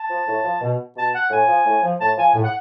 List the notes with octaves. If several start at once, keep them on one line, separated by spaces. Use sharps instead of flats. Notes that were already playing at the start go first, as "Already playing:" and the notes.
Already playing: A5
F3
A2
F3
B2
B2 A5
F#5
A2 G#5
F3
A2
F3
A2 A5
F3 G#5
A2
F#5